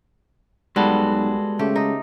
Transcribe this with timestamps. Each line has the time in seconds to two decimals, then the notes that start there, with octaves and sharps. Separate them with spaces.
0.76 B1 G3 G#3 B3 F#4 A4
1.59 C#3 A3 G4
1.76 D#4